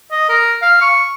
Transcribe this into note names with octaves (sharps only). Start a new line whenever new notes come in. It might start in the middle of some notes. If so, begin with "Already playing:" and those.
D#5
A#4
F5
C#6